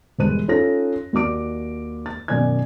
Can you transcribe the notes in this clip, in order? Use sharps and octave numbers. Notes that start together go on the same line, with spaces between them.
E1 G3 G#3 B4 F#6 D#7
C#4 D#4 F4 A4 A#6
D#2 F#4 D5 D6 D7
A6
F#2 B2 D#3 D5 G#5 G#6